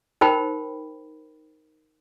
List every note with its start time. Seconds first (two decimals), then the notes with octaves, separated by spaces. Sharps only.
0.21 D#4 A#4 C5 G5 B5